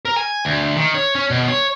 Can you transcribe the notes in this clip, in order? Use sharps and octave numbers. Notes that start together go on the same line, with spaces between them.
A#4
G#5
D2
D#3
C#5
C#4
B2
C#5